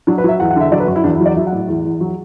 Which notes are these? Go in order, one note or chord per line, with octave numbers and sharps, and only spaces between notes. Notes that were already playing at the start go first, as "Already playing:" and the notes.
F#3 D4
B4
F#3 E5
E2 F#5
F#5
D3 E5
F#3 D5
B4
F#2 F#4
E4
E2 D4
E4
F#3
D5
F#3 E5
F#5
A2
E2
E2
F#3